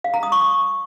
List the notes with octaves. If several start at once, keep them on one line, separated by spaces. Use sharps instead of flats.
F5
A#5
D#6
C#6
D#6